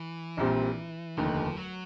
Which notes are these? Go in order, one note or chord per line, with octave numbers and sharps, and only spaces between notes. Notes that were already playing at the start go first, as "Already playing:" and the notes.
Already playing: E3
A#1 A#2 G3 C4
F1 D#2 D3 F3
F#3